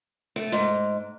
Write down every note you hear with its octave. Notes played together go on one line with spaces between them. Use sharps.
A3
G#2